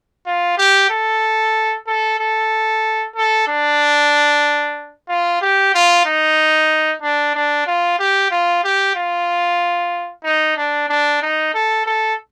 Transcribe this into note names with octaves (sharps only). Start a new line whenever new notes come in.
F4
G4
A4
A4
A4
A4
D4
F4
G4
F4
D#4
D4
D4
F4
G4
F4
G4
F4
D#4
D4
D4
D#4
A4
A4